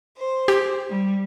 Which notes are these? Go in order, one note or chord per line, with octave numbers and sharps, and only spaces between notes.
C5
G4
G3